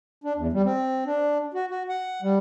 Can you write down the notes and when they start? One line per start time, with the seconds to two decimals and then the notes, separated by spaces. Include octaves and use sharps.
0.24 D4
0.36 E2
0.53 G3
0.65 C4
1.06 D4
1.54 F#4
1.70 F#4
1.89 F#5
2.22 G3